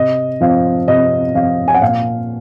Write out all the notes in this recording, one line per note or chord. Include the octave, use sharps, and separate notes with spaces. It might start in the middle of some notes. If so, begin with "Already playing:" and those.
Already playing: C3 D#5
F3 C4 F5
C3 D#5
F3 C4 F5
G#5
F#5
A#2 F5